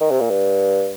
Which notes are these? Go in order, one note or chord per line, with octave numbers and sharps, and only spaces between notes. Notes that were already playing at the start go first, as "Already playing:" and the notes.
D#3
C3
A#2
G2